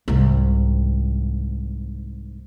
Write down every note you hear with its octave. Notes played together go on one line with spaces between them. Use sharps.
C2 G#2